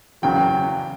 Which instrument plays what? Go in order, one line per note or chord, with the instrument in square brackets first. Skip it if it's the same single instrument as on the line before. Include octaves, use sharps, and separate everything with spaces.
[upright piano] F#1 E2 C#3 F#3 [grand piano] G5